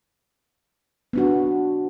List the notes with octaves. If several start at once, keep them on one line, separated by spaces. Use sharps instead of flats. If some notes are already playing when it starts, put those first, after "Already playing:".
B3 D4 F#4